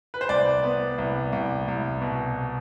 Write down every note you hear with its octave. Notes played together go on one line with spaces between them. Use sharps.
B4
C5
C2 D5
B3
C2
C2
C2
B2